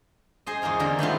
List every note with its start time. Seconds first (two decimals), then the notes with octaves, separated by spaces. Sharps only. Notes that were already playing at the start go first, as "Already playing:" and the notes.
0.46 G#4 C5 D#5
0.62 E2 A#3 F4 A#4 C5
0.80 D3 G3 A#3 C4 A#4
0.99 D#3 A3 B3 F4